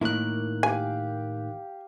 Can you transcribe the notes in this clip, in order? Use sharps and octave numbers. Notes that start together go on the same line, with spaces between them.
A2 D#3 A#3 E4 F#6
G4 F5 G#5 D6